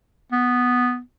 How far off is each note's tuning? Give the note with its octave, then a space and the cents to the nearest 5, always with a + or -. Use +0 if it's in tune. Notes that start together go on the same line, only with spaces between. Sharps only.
B3 +0